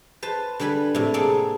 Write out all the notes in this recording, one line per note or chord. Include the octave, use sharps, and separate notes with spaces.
B4 C5 A5
D3 G3 B4 G#5 B5
A2 C3
A#3 C4 G#4 A4 D5